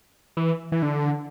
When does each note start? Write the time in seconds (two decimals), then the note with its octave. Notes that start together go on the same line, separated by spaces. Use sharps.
0.37 E3
0.72 E3
0.82 D3